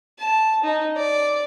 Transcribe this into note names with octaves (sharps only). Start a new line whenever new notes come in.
A5
D#4
D5